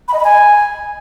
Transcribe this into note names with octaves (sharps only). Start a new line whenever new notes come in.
B5
D#5
B5
G#5